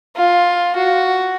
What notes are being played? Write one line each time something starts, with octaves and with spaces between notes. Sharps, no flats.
F4
F#4